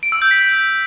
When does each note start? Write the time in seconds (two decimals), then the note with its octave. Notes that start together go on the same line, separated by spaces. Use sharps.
0.03 D7
0.12 E6
0.22 G6
0.31 B6